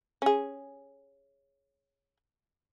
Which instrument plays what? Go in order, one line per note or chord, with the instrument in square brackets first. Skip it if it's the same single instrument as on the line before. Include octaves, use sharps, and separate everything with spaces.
[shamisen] C#4 G#4